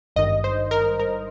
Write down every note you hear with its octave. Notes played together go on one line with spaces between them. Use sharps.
G#1 G2 D#3 D#5
C5
A#4
A#4